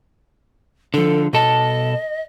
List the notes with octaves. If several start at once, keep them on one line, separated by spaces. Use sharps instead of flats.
D3 F3 A4
B2 A4 D#5 A5